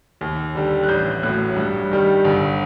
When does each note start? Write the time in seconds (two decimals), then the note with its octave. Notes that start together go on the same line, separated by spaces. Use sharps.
0.21 D#2
0.55 D3 G3
0.83 F#6
0.88 A1 G6
1.23 A2 F#3 F#6
1.56 G2
1.91 D#3 G3
2.24 G1